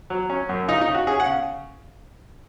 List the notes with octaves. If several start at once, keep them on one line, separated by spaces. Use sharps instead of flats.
F#3
C#4
F#2
C#3 D#4
D#4
C#3
F#4
C#4 G#4
F#5
C#3